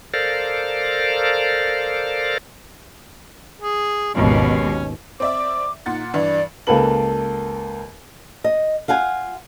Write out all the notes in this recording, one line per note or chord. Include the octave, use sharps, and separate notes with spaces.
A4 A#4 C5 D5 F5
G#4
G#1 D#2 B2 C#4
C4 D5 E5 D6
A#2 D#4 F#5 A6
G2 E3 D5
C#2 A#3 A4 B4 F#7
D#5
F4 F5 F#5 G#5